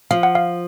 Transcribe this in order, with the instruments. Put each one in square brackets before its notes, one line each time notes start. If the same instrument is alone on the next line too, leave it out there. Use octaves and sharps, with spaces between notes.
[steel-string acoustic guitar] F3 [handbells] F5
[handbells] F#5
F5